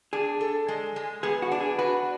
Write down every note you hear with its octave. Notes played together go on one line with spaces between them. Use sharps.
D4 G#4
A4
G#3
G#3
B3 G#4
F#4
D4
G#4
F#4 B4